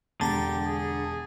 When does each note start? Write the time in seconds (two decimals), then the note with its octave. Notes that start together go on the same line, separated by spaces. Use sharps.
0.21 E1 D3 G4 A5 A#5 A6
0.65 G#4